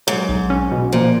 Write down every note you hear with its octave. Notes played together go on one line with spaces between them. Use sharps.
G#2 F#3
B1
C#4
B2
A#2 F3